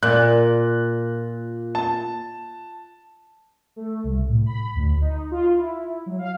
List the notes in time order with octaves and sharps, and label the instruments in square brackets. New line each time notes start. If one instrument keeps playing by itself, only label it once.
[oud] A#2 [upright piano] F#6
[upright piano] A5
[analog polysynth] A3
C2
A2
B5
D2
D#4
F4
E4
F#3
F5